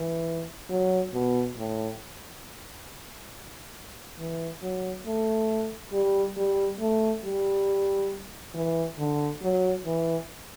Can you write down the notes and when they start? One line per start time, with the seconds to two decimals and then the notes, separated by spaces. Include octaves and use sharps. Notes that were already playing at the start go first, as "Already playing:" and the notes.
Already playing: E3
0.70 F#3
1.13 B2
1.57 A2
4.19 E3
4.62 F#3
5.06 A3
5.92 G3
6.37 G3
6.80 A3
7.24 G3
8.54 E3
8.98 D3
9.42 F#3
9.85 E3